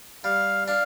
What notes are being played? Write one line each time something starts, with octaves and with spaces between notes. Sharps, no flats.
G3 F5
D4 F5